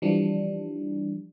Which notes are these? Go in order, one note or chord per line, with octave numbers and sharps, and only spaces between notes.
E3 F3 G3 D4